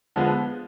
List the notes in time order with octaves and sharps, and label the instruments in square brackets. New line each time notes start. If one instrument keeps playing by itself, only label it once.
[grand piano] D3 F3 G#3 B3